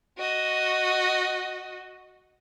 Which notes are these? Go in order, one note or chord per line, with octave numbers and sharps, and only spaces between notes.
F#4 D#5